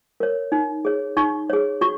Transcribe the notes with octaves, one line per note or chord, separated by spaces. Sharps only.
A#4 C#5
D#4
G#4 C#5
D#4 C#6
G#4 C#5
F#4 C#6